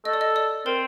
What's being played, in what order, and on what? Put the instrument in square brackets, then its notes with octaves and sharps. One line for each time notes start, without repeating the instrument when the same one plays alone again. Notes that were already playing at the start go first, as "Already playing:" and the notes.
[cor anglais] A4 [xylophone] D#5
[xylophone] D5
D#5
D5
[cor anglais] C4 [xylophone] A#4